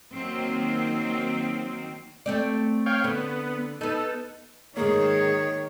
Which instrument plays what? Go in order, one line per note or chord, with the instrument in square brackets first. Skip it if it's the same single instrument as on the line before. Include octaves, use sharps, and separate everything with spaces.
[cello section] D#3 F#3 A#3 C4 D#4
[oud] A3 C4 D5
[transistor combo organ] C#5 F5 G5
[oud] D3 [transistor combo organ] B3
[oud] B3 D#4 [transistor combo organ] A4
[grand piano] G#2 A#3 [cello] D#3 [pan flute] G#4 [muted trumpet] C#5